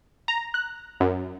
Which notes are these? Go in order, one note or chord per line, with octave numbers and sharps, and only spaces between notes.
A#5
F#6
F#2